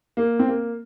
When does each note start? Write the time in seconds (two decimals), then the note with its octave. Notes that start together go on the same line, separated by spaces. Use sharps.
0.17 A#3
0.39 C4
0.48 A#3